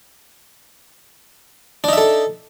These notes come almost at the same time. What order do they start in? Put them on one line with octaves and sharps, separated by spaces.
D4 D#4 E5 A4